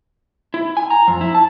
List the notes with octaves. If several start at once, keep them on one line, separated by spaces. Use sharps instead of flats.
E4
G#5
A#5
F2
E4
A5